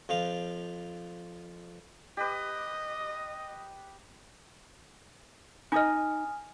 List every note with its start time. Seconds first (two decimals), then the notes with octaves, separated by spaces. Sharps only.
0.09 F2 F3 F5
2.17 G4 B4 D#5
5.72 D#4 D#5 G#5 D#6 F6